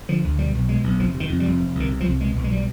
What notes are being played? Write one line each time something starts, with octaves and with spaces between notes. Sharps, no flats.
D3 F3
D2
B2 G3
B1
B2 G#3
B1
F1 F3
C3
D#3
F2
G3
F1
C3
C2 D#3
C3
F3
C2
B2 G#3
B1
G#3
B2 G3